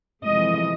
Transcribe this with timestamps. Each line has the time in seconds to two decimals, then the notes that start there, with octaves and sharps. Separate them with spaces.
0.24 F2 C3 E3 G#3 D#5